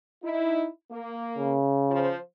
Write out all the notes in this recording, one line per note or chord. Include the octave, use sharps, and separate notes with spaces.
D#4 E4
A#3
C#3
F3 F4 C5